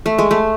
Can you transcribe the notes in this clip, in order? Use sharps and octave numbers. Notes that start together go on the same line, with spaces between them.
A3
G#3
A3